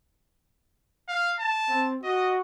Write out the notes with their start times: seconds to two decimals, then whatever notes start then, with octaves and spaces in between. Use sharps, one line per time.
1.08 F5
1.39 A5
1.69 C4
2.03 F#4 D#5